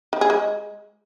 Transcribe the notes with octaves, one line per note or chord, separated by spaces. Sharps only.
D#3
G#4
G#3